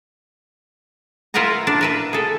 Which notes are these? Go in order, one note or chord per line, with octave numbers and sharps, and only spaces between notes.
E4 F4 A#4 B4 F#5 A#5
D4
A#4 B4 E5
G#4 A4